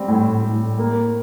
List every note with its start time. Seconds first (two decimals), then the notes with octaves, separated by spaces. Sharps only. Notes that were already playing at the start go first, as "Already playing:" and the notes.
Already playing: G3 C4
0.08 A2
0.44 A2
0.78 A#3